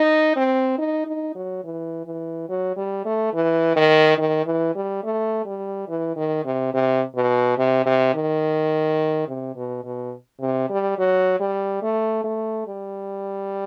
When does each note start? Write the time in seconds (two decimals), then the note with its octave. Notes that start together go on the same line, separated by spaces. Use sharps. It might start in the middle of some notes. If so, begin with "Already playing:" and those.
Already playing: D#4
0.36 C4
0.78 D#4
1.07 D#4
1.35 F#3
1.64 E3
2.06 E3
2.49 F#3
2.76 G3
3.05 A3
3.33 E3
3.76 D#3
4.18 D#3
4.46 E3
4.75 G3
5.04 A3
5.45 G3
5.88 E3
6.16 D#3
6.45 C3
6.74 C3
7.15 B2
7.58 C3
7.86 C3
8.14 D#3
9.28 C3
9.56 B2
9.84 B2
10.40 C3
10.69 G3
10.98 F#3
11.40 G3
11.83 A3
12.24 A3
12.68 G3